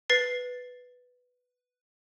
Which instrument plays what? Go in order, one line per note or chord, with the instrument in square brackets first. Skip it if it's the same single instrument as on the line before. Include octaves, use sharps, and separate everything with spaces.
[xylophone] B4 A6 C7